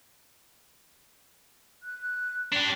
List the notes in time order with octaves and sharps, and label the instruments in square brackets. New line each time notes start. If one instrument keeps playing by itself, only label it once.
[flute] F#6
[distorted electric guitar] D4 G4 [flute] D5